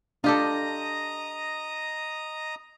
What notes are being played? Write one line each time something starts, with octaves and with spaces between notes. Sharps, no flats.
D4 F4 G4 A4 D#5 A#5 D#6